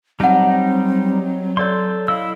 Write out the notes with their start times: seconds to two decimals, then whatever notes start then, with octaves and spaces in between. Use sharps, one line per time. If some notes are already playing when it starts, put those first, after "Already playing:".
0.20 F#3 G3 C4 D#4 F#5 A5
1.57 A4 C#5 D5 C6
2.08 E4 D#5 F5 E6